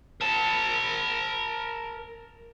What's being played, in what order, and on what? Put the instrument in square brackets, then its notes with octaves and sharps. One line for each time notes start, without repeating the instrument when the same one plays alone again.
[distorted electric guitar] A#4 A5